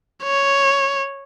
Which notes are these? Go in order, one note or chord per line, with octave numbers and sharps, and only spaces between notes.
C#5